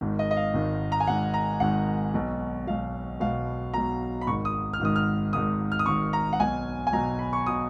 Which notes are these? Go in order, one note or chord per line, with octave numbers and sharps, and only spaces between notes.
G#1 G#2 D#3
D#5
D#5
F5
G#1 G#2 D#3
A#5
G#5
G#1 G#2 D#3 F#5
A#5
G#1 G#2 D#3 F#5
B1 B2
B1 B2 F5
B1 B2 F5
B1 B2 A#5
B5
G#1 G#2 D#3 C#6
D#6
F6
G#1 G#2 D#3 D#6
F6
G#1 G#2 D#3 D#6
F6
D#6
G#1 G#2 D#3 C#6
A#5
F#5
B1 B2 G#5
G#5
B1 B2 A#5
B5
C#6
B2 D#6